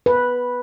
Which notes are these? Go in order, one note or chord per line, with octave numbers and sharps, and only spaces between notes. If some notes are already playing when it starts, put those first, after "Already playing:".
B4